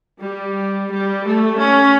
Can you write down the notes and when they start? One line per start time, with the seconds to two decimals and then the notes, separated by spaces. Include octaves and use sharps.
0.22 G3
0.90 G3
1.25 A3
1.59 C#4